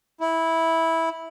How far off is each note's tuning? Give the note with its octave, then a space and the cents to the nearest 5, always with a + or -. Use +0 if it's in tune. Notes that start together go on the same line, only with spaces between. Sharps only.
E4 -10